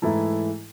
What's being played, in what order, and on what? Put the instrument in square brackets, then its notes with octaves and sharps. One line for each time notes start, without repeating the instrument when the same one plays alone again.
[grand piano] G#2 E3 A3 E4 A4